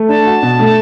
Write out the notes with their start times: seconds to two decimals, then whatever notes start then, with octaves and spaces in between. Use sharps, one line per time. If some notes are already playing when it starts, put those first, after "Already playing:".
Already playing: A3
0.09 D4 A5
0.26 F#4
0.43 B2
0.59 A3